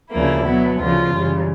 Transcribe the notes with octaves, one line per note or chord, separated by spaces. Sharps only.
D2 C#3 F3 A#3 E4
B2 F#3 B3
D2 C#3 F3 F4
F#2 C#3 E3 G3